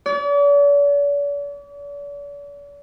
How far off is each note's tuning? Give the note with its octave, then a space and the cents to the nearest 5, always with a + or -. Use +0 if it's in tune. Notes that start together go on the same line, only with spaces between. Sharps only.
D5 -45